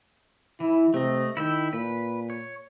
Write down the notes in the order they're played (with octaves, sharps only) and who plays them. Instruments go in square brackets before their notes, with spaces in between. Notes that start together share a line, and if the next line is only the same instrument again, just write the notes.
[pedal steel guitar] E3 [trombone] E4
[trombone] C3 [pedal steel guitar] A3 D#5
[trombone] D#3 [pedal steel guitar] E4 E5 G5
[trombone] A#2 [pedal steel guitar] B4
[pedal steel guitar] C#5